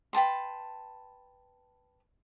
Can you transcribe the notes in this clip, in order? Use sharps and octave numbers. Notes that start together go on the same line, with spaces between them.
B4 G5 A5 C6